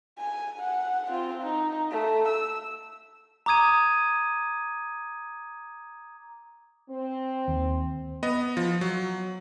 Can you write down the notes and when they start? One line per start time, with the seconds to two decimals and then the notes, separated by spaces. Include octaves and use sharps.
0.18 G#5
0.60 F#5
1.10 C4 F4
1.42 D#4
1.91 A3
2.28 E6
3.46 A#5 D6 D#6 G#6 D#7
6.89 C4
7.48 D#2
8.23 B3 D#5
8.57 F3
8.81 F#3